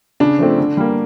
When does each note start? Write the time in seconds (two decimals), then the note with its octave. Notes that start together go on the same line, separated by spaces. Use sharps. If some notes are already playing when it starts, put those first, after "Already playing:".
0.20 C#3 D4
0.38 F3 A3 C4
0.58 D3
0.77 G3 A#3